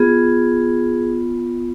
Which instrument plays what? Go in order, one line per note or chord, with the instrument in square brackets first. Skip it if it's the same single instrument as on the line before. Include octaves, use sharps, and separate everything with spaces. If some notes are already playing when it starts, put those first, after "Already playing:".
Already playing: [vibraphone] B3 F4 G#4